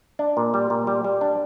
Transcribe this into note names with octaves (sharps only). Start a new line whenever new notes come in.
D4
A#2
G3
A#2
G3
G3
D4